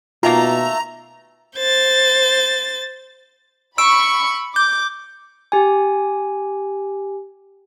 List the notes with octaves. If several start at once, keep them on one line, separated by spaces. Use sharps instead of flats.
B2 D#3 A3 A#3 F4 A#5
C5 A6
B5 C#6 E6 D7
D6 G6
G4 G#5